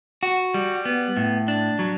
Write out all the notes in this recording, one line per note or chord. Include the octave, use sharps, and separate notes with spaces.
F#4
G3
B3
A2
D4
F#3